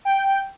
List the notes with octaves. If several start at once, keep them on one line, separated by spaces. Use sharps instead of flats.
G5